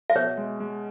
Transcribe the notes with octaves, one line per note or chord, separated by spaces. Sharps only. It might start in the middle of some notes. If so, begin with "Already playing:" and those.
E5
B2 C#5
G#3
G#3